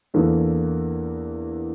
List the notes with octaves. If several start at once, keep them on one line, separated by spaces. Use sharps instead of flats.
E2 E3 A#3 D4 A4